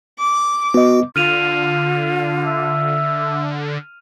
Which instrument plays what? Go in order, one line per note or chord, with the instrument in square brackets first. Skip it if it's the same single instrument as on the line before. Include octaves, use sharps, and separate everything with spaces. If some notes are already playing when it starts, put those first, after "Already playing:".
[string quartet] D6
[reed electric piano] B3 D#5 [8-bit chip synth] F#4
[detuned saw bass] D3 [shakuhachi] F4 [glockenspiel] F6 D#7 F7
[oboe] E5